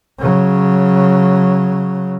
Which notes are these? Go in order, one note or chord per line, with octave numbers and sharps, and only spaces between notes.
C#3 F#3